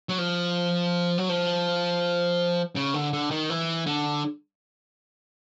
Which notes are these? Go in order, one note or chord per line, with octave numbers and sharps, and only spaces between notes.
F#3
F3
F#3
F3
C#3
D3
D3
D#3
E3
D3